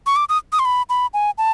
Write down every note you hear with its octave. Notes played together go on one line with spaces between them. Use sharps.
C#6
D6
D#6
D#6
C6
B5
B5
G#5
A5